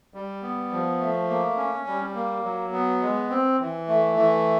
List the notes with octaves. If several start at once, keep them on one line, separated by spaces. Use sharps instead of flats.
G3
B3
F3
A3
A#3
C#4
G3
A#3
F#3
B3
G#3
C4
E3
A3
E3